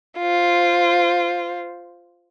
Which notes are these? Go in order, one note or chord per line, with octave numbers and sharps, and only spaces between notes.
F4 C5